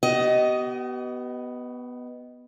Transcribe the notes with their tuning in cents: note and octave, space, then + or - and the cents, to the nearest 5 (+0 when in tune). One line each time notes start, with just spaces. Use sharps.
B3 +0 G4 -45 D#5 +0